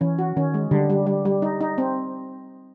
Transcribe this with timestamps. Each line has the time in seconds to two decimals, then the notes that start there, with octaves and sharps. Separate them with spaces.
0.01 E3 C#4
0.19 F#4
0.36 D#3 C#4
0.54 G#3
0.71 D3 G3
0.90 G3
1.07 G3
1.25 G3
1.42 D#4
1.61 D#4
1.78 C4